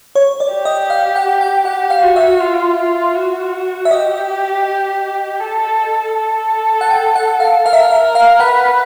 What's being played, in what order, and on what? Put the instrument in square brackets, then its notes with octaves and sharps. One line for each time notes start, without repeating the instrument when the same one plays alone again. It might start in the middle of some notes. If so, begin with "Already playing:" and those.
[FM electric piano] C#5
D5
[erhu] G4
[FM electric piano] D#5
F5
F#5
G5
[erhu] G4 [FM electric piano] F#5
[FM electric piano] F5
[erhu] F#4
[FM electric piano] E5
[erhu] F4
F4
F#4
[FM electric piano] E5
[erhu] G4 [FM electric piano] D#5
[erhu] A4
A4
[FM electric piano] F#5
G5
F#5
F5
[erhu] A#4 [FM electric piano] F5
[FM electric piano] E5
F5
E5
[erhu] A#4
[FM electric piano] F5
[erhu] B4 [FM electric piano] F#5